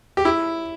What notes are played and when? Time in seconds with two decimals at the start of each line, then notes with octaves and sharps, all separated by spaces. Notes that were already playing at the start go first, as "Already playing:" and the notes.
0.17 G4
0.25 E4